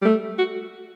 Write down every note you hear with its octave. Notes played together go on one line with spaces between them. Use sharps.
G3
A3
F#4